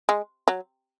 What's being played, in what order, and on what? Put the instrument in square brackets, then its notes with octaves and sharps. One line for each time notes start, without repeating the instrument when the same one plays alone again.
[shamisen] G#3
F#3